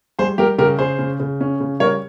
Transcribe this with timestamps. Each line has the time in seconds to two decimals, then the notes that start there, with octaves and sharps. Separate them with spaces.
0.19 G3 G#4 C5
0.38 G3 G4 A#4
0.58 C#3 G4 A#4
0.79 C#3 G#4 C5
0.99 C#3
1.20 C#3
1.41 C#4
1.60 C#3
1.80 G3 A#4 C#5